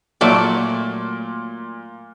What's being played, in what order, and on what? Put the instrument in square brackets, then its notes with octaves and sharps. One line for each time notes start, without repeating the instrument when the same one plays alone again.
[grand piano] A#2 [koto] F#3 A3 D5